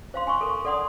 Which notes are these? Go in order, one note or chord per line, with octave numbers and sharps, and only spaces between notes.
C5 F5 C6
G#5 C6 C#6
A4 A#4
A4 D5 F#5 C6 D#6